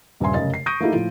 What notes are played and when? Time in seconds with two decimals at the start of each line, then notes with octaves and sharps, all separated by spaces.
0.20 D#1 G2 C#3 E5 G#5 C6
0.34 F1 F#2 C#3 D#5 A6
0.54 C7
0.66 C#6 D#6 G6 A#6 D7 D#7
0.80 A3 A#3 D#4 E4 G4
0.92 A2 F3